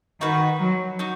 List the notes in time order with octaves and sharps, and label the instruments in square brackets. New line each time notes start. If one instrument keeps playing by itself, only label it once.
[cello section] D#3 [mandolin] D#4 F#4 B4
[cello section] F#3
[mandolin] D#4 F#4